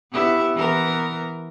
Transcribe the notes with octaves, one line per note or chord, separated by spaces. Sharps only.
B3 E4 G4
E3 B3 A#4